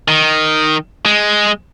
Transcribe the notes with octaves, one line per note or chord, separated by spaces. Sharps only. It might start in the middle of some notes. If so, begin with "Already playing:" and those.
D#3
G#3